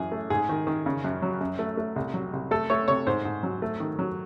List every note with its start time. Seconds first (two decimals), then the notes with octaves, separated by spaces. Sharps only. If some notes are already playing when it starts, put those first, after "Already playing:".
Already playing: F#2 E3 G#4
0.12 A3
0.30 G#2 G#4
0.49 D#3
0.67 D#3
0.86 C#3
1.04 F#2
1.22 F#3
1.41 F#2
1.59 A3
1.77 A3
1.96 C2
2.14 F#3
2.33 C2
2.51 A3 A4
2.70 A3 C#5
2.88 C3 C#5
3.07 G#2 C5
3.25 G#2
3.43 F#3
3.62 A3
3.80 D#3
3.99 F#3